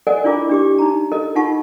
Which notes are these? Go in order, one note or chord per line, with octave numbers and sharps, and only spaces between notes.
A4 A#4 D5 D#5 F#5 G#5
D4 E4 F4 A#4 D6
D4 G4 D6
D#4 A#5
A4 A#4 D#5
D#4 F4 F#5 A5 C#6